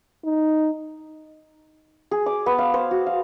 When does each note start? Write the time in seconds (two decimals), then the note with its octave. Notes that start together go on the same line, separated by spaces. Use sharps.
0.24 D#4
2.11 G#4
2.26 D6
2.46 B3
2.58 F5
2.74 C5
2.91 F#4
3.06 F5